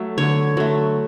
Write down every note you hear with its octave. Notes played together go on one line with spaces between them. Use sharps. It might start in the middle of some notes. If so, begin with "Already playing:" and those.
Already playing: F#3 A3
D3 C#5
F#3 A3